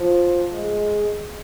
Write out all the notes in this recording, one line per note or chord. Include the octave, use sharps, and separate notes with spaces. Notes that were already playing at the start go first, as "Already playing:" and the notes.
Already playing: F3
G#3